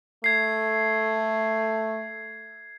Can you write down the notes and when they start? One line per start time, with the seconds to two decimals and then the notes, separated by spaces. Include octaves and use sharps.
0.24 A3 G#6 C7